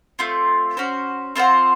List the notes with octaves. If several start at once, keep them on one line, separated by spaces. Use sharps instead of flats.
A3 C4 F4
C#4 F#4 C5
C4 F4 C5 F#5